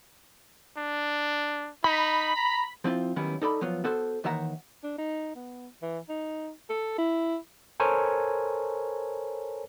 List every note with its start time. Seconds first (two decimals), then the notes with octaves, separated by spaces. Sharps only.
0.77 D4
1.84 D#4 B5
2.36 A#5
2.84 F3 C4 E4 F4
3.16 D#3 F#3 G3 B3 C#4 E4
3.42 D#4 A4 D5 B5
3.61 F3 F#3 B3 F4
3.84 B3 F#4 A4 C5
4.24 D#2 D#3 E3 E5 F#5 A#5
4.84 D4
4.98 D#4
5.35 B3
5.82 E3
6.09 D#4
6.70 A4
6.98 E4
7.80 A4 A#4 C5 C#5 G#5